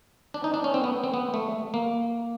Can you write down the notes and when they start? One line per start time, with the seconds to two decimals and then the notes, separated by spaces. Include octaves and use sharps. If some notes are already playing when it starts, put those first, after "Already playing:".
0.34 D4
0.44 D#4
0.54 D4
0.64 C#4
0.74 C4
0.84 B3
1.04 C4
1.14 B3
1.34 A3
1.74 A#3